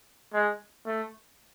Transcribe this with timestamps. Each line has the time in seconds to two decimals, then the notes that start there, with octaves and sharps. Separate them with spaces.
0.34 G#3
0.86 A3